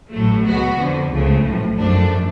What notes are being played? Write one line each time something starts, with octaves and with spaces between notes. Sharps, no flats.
A1 A2 F#3 A3
C#2 B2 F#3 B3 F#4
F2 D3 F3
C#2 C#3 F3 A3
B1 A2 F3
G#1 F#2 F3 A3 D4